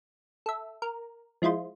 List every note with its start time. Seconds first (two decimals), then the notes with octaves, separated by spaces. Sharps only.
0.46 A4 E5
0.82 A#4
1.42 F3 G#3 E4 F4 C5